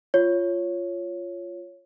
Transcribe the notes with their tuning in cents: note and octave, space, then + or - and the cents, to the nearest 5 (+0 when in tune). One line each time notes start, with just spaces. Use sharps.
F4 -5 C#5 +0